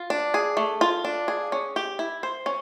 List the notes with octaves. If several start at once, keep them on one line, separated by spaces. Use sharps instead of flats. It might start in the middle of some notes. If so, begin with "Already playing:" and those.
Already playing: F4
D4
G#4
A3
F4
D4
G#4
C#4
G4
E4
C5
C#4